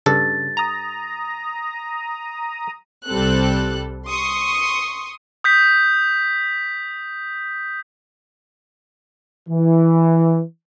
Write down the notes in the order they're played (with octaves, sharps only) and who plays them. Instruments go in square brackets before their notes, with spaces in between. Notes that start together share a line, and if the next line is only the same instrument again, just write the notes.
[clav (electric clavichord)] G2 A4 [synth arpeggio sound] C#3 [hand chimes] A6
[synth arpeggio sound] A#5 D#6
[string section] C2 G3 C4 A4 F#6
C6 C#6 D#6
[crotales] D#6 G6 B6
[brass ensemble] E3